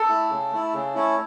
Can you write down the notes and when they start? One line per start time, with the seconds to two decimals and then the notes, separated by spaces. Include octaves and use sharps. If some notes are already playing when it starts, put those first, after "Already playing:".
Already playing: A4
0.09 A3 E4
0.30 C#3
0.52 A3 E4
0.73 C#3
0.95 A3 C#4 E4